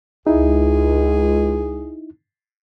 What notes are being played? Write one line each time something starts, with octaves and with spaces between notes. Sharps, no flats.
C#2 D#4 E4 G#4